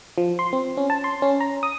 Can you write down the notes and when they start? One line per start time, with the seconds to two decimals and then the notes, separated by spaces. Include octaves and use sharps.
0.18 F3
0.39 C6
0.53 C4
0.77 C#4
0.90 A5
1.04 C6
1.22 C#4
1.41 A#5
1.63 D#6